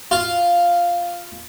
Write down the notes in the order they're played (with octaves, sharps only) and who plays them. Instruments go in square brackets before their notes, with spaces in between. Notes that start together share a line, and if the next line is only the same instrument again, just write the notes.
[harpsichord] F4